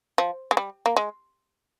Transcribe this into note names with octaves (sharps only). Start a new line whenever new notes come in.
F3
G#3
G3
A#3
G#3